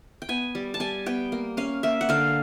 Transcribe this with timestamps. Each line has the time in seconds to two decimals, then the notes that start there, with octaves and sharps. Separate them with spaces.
0.22 G5
0.29 B3 G#5
0.55 G3
0.74 A5
0.80 G3 G#5
1.06 B3 G5
1.32 A#3
1.57 C#4 F5
1.83 A#3 E5
2.01 F#5
2.09 D3 F5